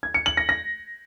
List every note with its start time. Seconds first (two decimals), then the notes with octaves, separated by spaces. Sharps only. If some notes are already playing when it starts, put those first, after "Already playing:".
0.03 G#6
0.14 C#7
0.26 F#7
0.37 A#6
0.49 A#6